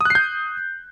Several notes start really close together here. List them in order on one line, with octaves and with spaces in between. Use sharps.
D#6 F#6 C7 G6